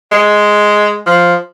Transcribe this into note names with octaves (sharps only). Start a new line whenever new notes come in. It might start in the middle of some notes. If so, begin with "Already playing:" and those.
G#3
F3